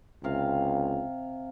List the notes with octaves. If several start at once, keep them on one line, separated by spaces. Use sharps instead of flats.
C#2 C3 F5